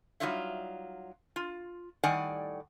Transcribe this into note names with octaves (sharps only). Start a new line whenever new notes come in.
F#3 G3 D#4 F4 C#5 E5
F4
A2 D#3 G3 D5 F#5 G#5